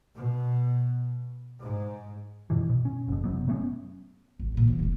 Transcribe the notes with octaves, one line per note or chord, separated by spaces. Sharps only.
B2
G#2
F#2 B2 D#3 E3
B2
C#4
F#1 F2
F#1 C3 F#3 B3
F#3 A3 B3 C#4
G#1
D1 A#2
E3 B3
F1 A3